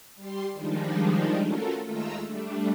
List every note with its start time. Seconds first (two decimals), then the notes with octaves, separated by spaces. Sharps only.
0.15 G3 G4 C6
0.53 D#3 F3 G3 G#3 D4 D#4
1.41 A3 C#4 F4 F#4 A4 A#4
1.85 D#2 G#3 A3 F4 A#5 E6
2.24 G3 A3 D4